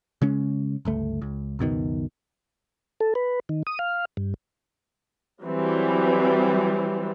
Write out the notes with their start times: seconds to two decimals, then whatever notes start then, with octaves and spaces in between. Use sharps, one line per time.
0.22 C#3 G#3 C#4
0.85 G1 C#2 A3
1.22 C#2
1.59 C#2 F#2 B2 D#3
3.00 A4
3.15 B4
3.49 D#3
3.67 D#6
3.79 F5
4.17 G2
5.44 E3 F#3 G3 C4